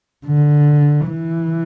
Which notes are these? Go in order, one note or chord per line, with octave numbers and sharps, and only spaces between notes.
D3
E3